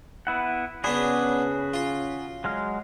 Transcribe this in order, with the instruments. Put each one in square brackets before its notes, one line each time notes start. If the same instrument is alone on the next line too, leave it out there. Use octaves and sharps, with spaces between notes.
[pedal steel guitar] B3 E4 F#5
[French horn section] C#3 C#4 [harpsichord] B3 D4 [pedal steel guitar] F#4 G#4 B5
[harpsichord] F4
[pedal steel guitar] F#3 G#3 F6